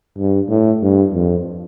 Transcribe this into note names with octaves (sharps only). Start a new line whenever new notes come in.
G2
A2
G2
F2